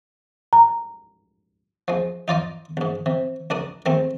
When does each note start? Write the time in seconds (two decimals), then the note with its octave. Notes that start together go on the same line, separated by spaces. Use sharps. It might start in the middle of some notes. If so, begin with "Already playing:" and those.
0.53 A#5
1.88 F3 G#3
2.28 D#4 F4 D5 D#5
2.77 A#1 G#2
3.06 C3
3.50 C#2 D4 A#4 D#6
3.86 D#3 G#3 A3 C4